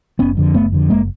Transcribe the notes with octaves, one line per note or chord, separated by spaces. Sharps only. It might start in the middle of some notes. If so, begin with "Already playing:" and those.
F#1 B3 C#4
F2 D3
F#1 A3 B3
F2 D3
F#1 G#3 A#3